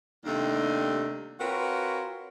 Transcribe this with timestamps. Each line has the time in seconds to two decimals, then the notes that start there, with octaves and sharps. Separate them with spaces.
0.25 D#2 C3 G3 A3 D4 D#4
1.39 C4 F4 F#4 A#4 B4 C#5